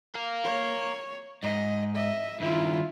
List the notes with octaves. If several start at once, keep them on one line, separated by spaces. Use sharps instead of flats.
A#4 F5
C#5
G#2 D#5
D#5 E5
G2 D#3 E4 F4